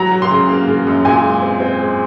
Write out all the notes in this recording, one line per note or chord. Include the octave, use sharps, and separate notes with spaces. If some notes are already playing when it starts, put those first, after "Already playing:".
Already playing: F#3 A#5
F#3
C6
C#3
A#3
C#3
F#2
A#2 G#5
G#3
C4
C4
G#3